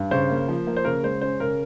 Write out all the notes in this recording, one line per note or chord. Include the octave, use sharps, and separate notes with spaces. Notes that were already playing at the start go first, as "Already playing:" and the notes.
Already playing: G2
C#3 C5
A#3
F3
A#3
C5
C#3 A#4
G#3 C5
C#4 C5
C#3 A#4